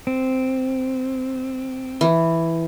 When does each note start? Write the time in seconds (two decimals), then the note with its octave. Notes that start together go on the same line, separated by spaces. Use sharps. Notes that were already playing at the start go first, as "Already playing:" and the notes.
0.07 C4
2.01 E3